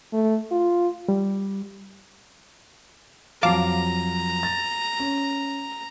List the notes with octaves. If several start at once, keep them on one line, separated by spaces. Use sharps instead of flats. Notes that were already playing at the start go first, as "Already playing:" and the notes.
A3
F4
G3
F2 F#3 F5 A5 A#5 D6
A6
C#4